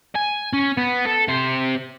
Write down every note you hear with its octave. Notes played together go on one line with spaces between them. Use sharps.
G#5
C#4
B3
A4
C3 C5